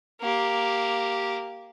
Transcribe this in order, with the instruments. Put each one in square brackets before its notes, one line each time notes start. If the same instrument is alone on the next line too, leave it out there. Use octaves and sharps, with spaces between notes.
[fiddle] A#3 G4